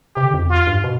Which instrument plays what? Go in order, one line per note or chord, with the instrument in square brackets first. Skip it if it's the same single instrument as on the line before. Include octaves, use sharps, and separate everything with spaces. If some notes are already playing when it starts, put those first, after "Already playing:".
[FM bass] C3 [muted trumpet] G4
[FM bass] D3
F2
E2
[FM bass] F2 [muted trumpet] F4
[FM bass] G2
B2